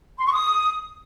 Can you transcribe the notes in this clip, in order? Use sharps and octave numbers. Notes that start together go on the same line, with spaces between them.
C6
C#6
D#6